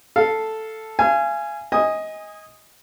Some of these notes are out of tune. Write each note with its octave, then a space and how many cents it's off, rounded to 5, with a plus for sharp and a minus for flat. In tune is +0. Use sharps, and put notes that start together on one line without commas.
A4 +0 F5 +0
F5 -35 G#5 +0
D#5 +20 G#5 -20 D#6 +0